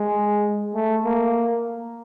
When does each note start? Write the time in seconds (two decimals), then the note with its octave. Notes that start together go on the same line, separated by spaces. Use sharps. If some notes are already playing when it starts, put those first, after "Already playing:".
Already playing: G#3
0.75 A3
1.05 A#3